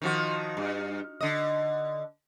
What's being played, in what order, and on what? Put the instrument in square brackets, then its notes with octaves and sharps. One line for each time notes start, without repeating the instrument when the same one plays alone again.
[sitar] D#3 F3 F#4
G2
D3 D#5